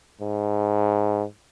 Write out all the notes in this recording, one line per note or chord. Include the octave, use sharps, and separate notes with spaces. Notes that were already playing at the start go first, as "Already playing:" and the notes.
G#2